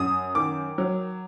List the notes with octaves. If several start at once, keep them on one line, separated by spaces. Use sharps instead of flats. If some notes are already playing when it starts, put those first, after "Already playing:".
Already playing: F#2 D#6
D#3 D6
F#3